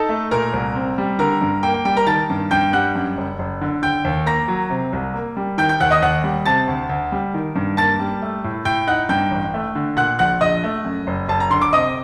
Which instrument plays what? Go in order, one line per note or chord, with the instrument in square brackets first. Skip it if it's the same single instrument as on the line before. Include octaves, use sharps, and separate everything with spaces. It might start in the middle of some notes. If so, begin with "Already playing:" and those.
Already playing: [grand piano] D#4 A4 A5
A3
A#2 A#4 A#5
C2
C4
G3
D3 A#4 A#5
G2
A#3 G5
G5
G3 G5
A#4 A#5
D#3 A5 A6
G2
G2 G5 G6
G3 F#5 F#6
F#2
F#1
F#1
D3
D3 G5 G6
D#2
A#3 A#5 A#6
F#3
C3
C2
A#3
G3
D#3 G5 G6
G5 G6
D#2 F#5 F#6
D#5 D#6
D#2 F#5 F#6
G3
C3 A5 A6
D2
D2
G3
D#3
G2
A#3 A5 A6
G3
A3
A2
A2 G5 G6
D#4 F#5 F#6
G2 G5 G6
A1
A3
D3
A#2 F#5 F#6
A#1 F#5 F#6
A#1 D#5 D#6
A3
F#2
F#1
F#1 A5
A#5
D3 C6
D6
C3 D#5 D#6